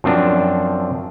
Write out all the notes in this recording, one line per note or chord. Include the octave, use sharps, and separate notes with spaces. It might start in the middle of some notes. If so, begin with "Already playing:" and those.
F#2 F3 C4 D4 F4